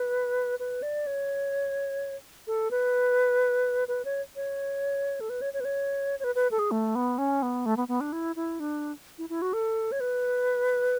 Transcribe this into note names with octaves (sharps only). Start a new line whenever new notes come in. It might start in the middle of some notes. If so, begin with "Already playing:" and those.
Already playing: B4
B4
D5
C#5
A4
B4
B4
C#5
C#5
A4
B4
C#5
C#5
B4
C#5
C#5
B4
B4
A4
G#4
A3
B3
C#4
B3
A3
B3
B3
D4
E4
E4
D4
E4
E4
F#4
A4
C#5
B4